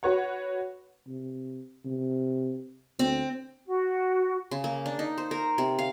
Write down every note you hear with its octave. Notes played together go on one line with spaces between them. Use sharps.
F#4 B4 C#5 F#5
C3
C3
D2 C4
F#4
C#3
A#3
D4
D#4
C5
A#4
C3
F5